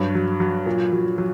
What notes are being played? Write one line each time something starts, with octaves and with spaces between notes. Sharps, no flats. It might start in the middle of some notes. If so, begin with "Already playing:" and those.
Already playing: G2 F#3 C#5
F#3
F#3
A#2
F#3
F#3